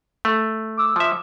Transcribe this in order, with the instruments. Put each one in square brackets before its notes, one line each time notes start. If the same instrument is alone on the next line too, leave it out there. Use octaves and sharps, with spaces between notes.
[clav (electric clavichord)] A3
[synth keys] D6 E6
[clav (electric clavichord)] F3 E5